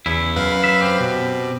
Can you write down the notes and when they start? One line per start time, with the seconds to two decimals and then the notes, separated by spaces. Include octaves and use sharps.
0.06 E2 C#3 E4
0.36 F#2 B4 F5
0.64 F#3 E5
0.81 C4 G4
1.00 B2